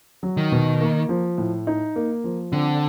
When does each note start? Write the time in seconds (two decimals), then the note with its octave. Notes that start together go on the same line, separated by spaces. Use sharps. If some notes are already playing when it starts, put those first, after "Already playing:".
0.23 F#3
0.37 D#3
0.52 B2
0.81 A#3
1.09 F3
1.38 A2
1.67 D#4
1.96 A#3
2.24 F3
2.52 D3 C4